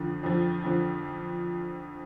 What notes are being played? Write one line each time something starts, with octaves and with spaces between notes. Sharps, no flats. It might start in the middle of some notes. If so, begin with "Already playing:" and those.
Already playing: F2 D3 F3
F2 D3 F3
F2 D3 F3